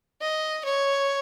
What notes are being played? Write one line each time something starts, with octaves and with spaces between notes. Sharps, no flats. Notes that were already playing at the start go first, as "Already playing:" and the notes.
D#5
C#5